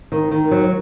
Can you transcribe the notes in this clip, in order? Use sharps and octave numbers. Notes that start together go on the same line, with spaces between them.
D#3
D#3
F#3